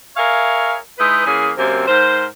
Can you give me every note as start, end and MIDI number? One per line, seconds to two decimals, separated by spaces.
0.17 0.75 68
0.17 0.75 70
0.17 0.75 73
0.17 0.75 76
0.17 0.75 77
0.99 1.25 56
0.99 1.25 63
0.99 1.25 64
0.99 1.25 71
1.26 1.51 52
1.26 1.51 58
1.26 1.51 61
1.26 1.51 68
1.57 1.85 42
1.57 1.85 48
1.57 1.85 58
1.57 1.85 60
1.88 2.25 44
1.88 2.25 70
1.88 2.25 72